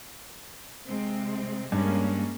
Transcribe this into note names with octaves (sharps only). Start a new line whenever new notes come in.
C3 G#3 C4
G2 G#3 A#3 C#4